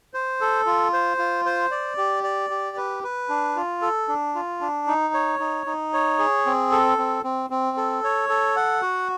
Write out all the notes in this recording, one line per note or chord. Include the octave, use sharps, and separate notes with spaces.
C5
A4
F4
C5
F4
C5
D5
G4
D5
G4
B4
B4
D4
F4
A4
D4
F4
D4
D#4
C#5
D#4
D#4
C#5
G#4
C4
A4
C4
C4
C4
A4
C#5
A4
F#5
F#4